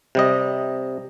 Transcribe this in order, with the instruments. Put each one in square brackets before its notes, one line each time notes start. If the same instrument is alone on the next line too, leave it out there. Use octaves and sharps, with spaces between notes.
[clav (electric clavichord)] C3 G3 D#5